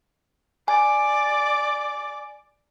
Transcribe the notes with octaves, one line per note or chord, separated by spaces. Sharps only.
D5 G#5